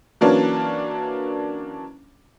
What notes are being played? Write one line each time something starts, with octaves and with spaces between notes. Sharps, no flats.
E3 F#3 A#3 C#4 D4